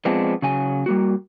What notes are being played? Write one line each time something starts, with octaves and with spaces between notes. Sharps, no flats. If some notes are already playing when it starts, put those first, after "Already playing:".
F3 G#3 B3 C4 D4
C#3 F#3 G#5
G3 A#3 F#4